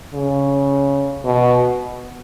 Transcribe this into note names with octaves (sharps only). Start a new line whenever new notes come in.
C#3
B2